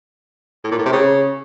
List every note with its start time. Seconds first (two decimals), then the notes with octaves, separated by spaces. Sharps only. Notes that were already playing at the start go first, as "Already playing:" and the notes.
0.64 A2
0.72 A#2
0.79 A2
0.86 C3
0.93 C#3